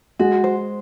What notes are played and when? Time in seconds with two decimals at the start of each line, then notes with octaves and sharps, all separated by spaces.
0.19 G#3 F#4
0.44 C5